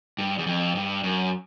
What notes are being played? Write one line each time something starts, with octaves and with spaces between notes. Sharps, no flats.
G2
E2
F2
G2
F#2